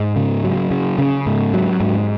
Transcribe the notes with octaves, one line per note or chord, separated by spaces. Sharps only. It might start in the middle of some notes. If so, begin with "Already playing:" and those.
Already playing: G#2
C#3
F#3
C#3
C#3
G#2
F#3
G#2